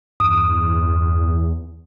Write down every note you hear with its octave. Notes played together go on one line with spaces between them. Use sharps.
E2 G2 D#6